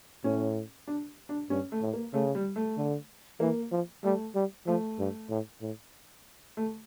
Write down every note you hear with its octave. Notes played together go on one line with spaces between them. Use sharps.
A2 C#4
D4
D4
G2 C#4
A3
A2
A#3
C#3 A3
G3
A3
D3
E3 A#3
F3
G3 A3
G3
F3 A3
G2
A2
A2
A3